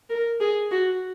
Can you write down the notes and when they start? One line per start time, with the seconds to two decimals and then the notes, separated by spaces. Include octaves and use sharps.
0.10 A#4
0.40 G#4
0.71 F#4